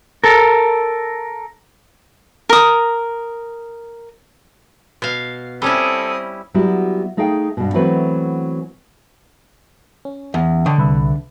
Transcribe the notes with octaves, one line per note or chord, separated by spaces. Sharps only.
A4 A#4
A#4 D#6
B2 F5
G3 C4 C#4 E4 A4 D#6
F#3 G3 B3 E4 F#4
A3 D#4 G#4 F5 G5
G2 B2
E3 F#3 A3 B3 C4 B4
C#4
E2
D3 C#5 D#5 G5
C2 B4 E5